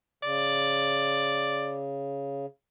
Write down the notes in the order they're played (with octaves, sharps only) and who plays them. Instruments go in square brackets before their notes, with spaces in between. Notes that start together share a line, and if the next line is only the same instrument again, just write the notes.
[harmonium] C#3 [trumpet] D5